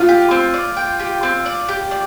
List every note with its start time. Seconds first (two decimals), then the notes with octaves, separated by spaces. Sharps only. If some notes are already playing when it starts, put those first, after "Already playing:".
Already playing: F4
0.09 G4
0.31 C4
0.54 D5
0.76 G5
1.00 G4
1.23 C4
1.45 D5
1.68 G4
1.91 D5